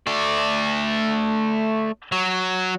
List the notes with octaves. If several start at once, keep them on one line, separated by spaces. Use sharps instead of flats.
A3 D5
F#3